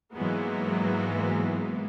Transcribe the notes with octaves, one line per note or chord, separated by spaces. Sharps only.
G#2 E3 F#3 G#3 A#3 B3